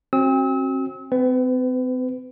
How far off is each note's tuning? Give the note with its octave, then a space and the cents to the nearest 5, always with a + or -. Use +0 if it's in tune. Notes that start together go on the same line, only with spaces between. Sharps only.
C4 +35 F#4 +0 E6 -40
C4 -40 B4 +35